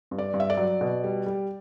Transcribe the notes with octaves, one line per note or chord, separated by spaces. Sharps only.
G2
D5
G2
E5
D5
F#3
B2
G3
G3